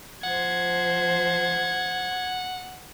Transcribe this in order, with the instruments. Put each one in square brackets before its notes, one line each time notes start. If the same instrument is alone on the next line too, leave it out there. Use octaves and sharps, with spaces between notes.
[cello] F3 C5 [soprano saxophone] F#5 [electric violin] G#6